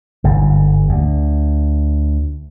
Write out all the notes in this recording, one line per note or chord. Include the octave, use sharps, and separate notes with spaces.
G1 G#2
D2